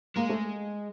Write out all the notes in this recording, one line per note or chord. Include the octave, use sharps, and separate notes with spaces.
G#3 A#3
A3